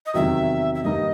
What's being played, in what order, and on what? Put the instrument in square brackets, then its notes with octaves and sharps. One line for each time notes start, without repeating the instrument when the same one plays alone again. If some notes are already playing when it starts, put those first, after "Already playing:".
[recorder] D#5
[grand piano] E2 C3 D#3 F#3 [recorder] E5
[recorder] E5
[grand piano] G2 D#3 G3 A#3 D#4 [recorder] D#5